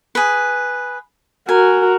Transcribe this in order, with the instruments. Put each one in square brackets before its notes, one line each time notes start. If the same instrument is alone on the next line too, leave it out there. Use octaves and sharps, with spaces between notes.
[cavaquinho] G#4 B4
[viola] F#4 A#4 [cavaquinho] G#5